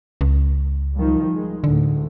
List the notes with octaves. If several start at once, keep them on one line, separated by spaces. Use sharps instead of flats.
C#2
D#3 F3 G3
G#3
D2 A2 D3